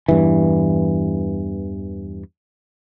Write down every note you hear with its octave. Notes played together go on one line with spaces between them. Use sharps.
E2 G2 E3